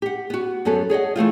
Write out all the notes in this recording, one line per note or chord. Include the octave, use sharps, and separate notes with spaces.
G4 F#5
B3 F#4
F#2 F#3 B3 A4 G#5
G#4 C#5 D#5 F#5
E3 A3 C4 F4